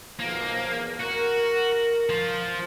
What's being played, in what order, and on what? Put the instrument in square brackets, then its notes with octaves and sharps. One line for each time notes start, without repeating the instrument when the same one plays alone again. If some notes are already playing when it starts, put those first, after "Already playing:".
[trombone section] B1 F3 [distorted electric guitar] A#3
[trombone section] E2
[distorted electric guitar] F#4 [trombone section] A#4
[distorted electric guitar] F3 F4